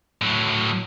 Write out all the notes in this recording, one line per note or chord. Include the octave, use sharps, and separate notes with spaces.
A2 F#3